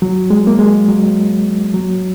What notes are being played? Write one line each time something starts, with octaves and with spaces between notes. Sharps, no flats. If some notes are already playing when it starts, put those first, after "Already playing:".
F#3
G#3
A#3
G#3
F#3
F#3